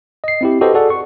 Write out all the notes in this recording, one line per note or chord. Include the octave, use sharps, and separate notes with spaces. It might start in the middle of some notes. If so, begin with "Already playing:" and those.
D#5 C7
C4 E4 G4
F#4 G4 A4 B4 C5 D#5
F#4 G#4 A4 D5 F#5
C#6